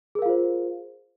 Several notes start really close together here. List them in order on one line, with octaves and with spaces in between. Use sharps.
G#4 A#4 F5 F4 C5